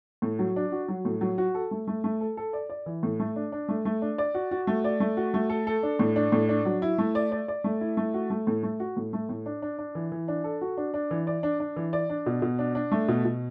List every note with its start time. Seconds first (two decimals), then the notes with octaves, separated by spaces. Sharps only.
0.22 A2
0.39 F#3
0.56 D4
0.72 F#4
0.88 F#3
1.05 A2
1.21 F#3
1.38 F#4
1.55 A4
1.71 A3
1.87 A3
2.04 A3
2.21 A4
2.37 A4
2.53 D5
2.70 D5
2.86 E3
3.03 A2
3.20 A3
3.36 D4
3.52 D4
3.69 A3
3.85 A3
4.02 D4
4.18 D5
4.34 F#4
4.51 F#4
4.67 A3
4.84 D5
5.00 A3
5.17 F#4
5.34 A3
5.50 A4
5.67 A4
5.83 D4
5.99 A2
6.16 D4
6.32 A2
6.49 D4
6.65 F#3
6.82 E4
6.98 A3
7.15 D5
7.32 D5
7.48 D5
7.64 A3
7.81 E4
7.97 A3
8.14 F#4
8.30 A3
8.47 A2
8.63 A3
8.80 F#4
8.97 A2
9.13 A3
9.29 A2
9.46 D4
9.62 D4
9.79 D4
9.95 E3
10.12 E3
10.28 D4
10.44 A4
10.61 F#4
10.77 D4
10.94 D4
11.11 E3
11.27 D5
11.43 D4
11.60 D4
11.76 E3
11.93 D5
12.10 D4
12.26 B2
12.42 B2
12.59 D4
12.75 D4
12.92 A3
13.08 B2
13.25 B2